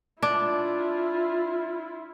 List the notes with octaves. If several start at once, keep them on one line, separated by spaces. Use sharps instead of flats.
D4 E4 F4